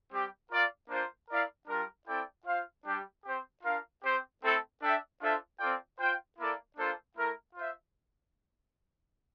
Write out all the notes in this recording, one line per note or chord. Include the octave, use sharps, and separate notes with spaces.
G3 C4 G4
F4 A#4 D5 F5
A#3 D4 F4 C5
E4 A#4 D5 F5
G3 D4 F4 A#4
C4 E4 A4 D5 G5
F4 C5 F5
G3 D4 G4
C4 G4 C5
D4 F4 A#4 F5
C4 G4 C5
A3 C4 E4 A4
D4 A4 E5 G5
D4 F4 A4 C5 E5
C4 F4 A4 D5 G5
F4 C5 G5
A#3 E4 A4 D5
A#3 D4 F4 A4 C5
A3 E4 A#4
F4 C5 E5